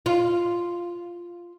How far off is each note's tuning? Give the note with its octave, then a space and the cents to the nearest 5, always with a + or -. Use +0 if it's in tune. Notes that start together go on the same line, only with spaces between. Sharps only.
F4 -5